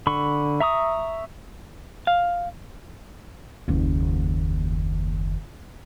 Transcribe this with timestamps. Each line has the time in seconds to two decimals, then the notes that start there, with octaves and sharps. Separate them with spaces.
0.07 D3 B5 C#6
0.60 E5 A#5 C#6 D#6
2.07 F5
3.68 F#1 D#2